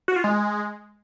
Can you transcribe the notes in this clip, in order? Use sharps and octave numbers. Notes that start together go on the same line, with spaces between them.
F#4
F4
G#3